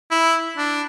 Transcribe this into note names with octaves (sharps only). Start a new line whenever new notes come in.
E4
D4